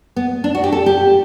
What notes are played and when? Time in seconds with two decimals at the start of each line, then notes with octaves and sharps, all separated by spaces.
0.16 B3
0.44 D4
0.55 F#4
0.64 G4
0.72 A4
0.86 G4